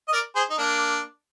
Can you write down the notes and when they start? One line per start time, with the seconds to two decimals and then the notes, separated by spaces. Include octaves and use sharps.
0.08 D#5
0.13 A#4 D5
0.36 G#4 C5
0.50 D#4
0.58 A#3 D4